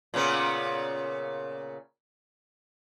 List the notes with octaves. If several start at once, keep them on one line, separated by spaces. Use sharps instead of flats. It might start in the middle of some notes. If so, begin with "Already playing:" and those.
A#2 C#3 B3